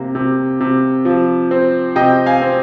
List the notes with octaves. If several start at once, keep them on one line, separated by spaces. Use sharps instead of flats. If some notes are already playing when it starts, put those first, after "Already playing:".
Already playing: C3 A#3
C3
C3
F3
C4
C3 D#5 G5
F5 G#5
C4